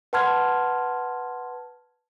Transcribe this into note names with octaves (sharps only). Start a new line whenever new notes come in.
B4 F#5 A5 C6 F6 G#6